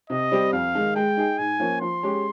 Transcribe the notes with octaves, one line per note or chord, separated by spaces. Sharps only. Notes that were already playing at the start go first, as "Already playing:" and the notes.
C3 D#5
G3 C4 G4
F2 F5
D#3 G#3 D#4
G#3 G5
D#4 G#4
G#2 G#5
F3 A#3 C#4
F3 C6
G#3 C#4 G4